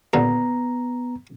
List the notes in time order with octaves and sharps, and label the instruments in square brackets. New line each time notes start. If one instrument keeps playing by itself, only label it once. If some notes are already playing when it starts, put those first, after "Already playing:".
[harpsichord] D#2 A#2 D3 [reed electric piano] B3 A#5